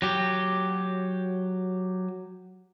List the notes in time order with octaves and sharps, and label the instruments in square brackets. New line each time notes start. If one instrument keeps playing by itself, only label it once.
[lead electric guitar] F#3 G4